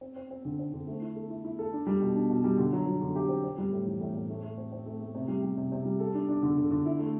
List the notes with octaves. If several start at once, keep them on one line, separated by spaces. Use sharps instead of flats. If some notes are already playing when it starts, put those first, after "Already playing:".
C4
C4
C4
D3
C4
D3
A3
E4
A4
E4
E4
A4
D4
G3
B2
D4
B2
G3
D3
F#3
F#3
D3
G4
C4
C4
G3
A2
E3
A2
A2
A3
A3
C4
C4
A3
A3
C3
G3
G3
C3
C3
G3
A4
D4
D4
D3
D3
D3
E4
A3